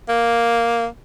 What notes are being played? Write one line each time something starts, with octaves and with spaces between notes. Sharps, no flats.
A#3